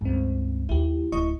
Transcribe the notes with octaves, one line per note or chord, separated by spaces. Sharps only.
C#2 G2 C4
D#2 E4 G4
D1 E4 D#5 C#6